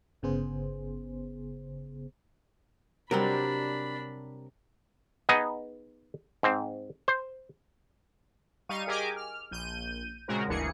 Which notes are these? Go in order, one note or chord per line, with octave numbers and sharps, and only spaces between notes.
G1 C#3 B3 G#4 C5
C3 F#3 G3 C4 D4 A#4 B5
B3 D#4 G#4 D#5
G#2 C4
C5
G3 D#4 F5 C#6 D#7
G4 G#4 A#4 D#5 G#5 D6
F6
A#1 G6 D#7
A#2 C#3 G#3 C4 F#4 A#4
G1 D2 E3 A#3 G#4 C#7